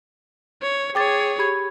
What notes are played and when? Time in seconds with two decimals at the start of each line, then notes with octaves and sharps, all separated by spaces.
0.63 C#5
0.95 G#4 C#5 G5 D6 A6
1.39 G4 B5 G#6